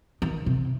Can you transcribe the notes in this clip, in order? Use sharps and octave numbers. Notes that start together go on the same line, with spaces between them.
D#3
C3